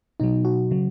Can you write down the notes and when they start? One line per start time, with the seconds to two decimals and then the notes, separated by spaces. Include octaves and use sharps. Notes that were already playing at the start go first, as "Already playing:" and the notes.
0.20 B2 F#3 D#4
0.45 F#4
0.71 C#3 F#3